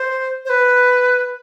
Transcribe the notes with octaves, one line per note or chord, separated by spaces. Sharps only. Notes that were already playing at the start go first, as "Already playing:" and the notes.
Already playing: C5
C5
B4